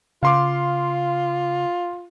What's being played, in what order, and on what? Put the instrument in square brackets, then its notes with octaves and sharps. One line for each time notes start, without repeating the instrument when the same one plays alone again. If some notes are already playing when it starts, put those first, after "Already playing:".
[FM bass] C#3 [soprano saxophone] F4 [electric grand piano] F5 C6 D6